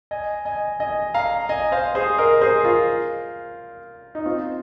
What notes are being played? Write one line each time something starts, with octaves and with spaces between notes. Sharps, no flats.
D#5 G#5
D#5 G#5
D#5 G#5
F5 A#5
D#5 G#5
C5 F5
G#4 C5
A#4 D#5
G#4 C5
F4 A#4
D#4
C4 F4